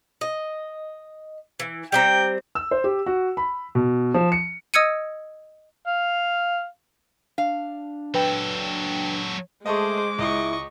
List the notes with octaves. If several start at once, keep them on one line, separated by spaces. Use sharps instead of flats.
D#5
E3
G3 C4 G5 A#5
E6
C5
G4
F#4
B5
B2
F3
C#7
D#5 D#6 E6 G#6 C#7 D#7
F5
D4 F5
F#3 A4 B4 G5
G#3 A3 G#4 C5 D#5 A5 C#6 D6
C#2 E4 D#5 C#6